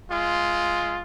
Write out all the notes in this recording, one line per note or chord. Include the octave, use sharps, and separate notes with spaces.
G#3 F4